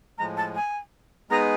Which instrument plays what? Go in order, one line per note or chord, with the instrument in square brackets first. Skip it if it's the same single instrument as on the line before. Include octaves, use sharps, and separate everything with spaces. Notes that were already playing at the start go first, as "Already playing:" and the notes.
[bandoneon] A2 F3 G#3 [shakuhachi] A#5
[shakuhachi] A5
G#5
[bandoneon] G#3 B3 D#4 G#4 B4 [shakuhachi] A#5